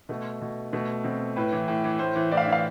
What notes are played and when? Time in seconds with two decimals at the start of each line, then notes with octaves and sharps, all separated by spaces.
0.09 B2 A3
0.41 B2
0.73 B2 A3
1.04 B2 C4
1.36 A2 B4
1.52 E3
1.68 A2
1.84 E3
1.99 A2 C5
2.16 E3
2.31 A2 D5
2.37 F5
2.41 E5
2.48 E3 F5